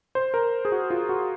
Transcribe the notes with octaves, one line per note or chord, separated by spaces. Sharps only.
C5
A#4
G#4
F#4
F4
F#4